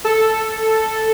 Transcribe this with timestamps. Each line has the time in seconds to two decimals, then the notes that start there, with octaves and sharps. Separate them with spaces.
0.04 A4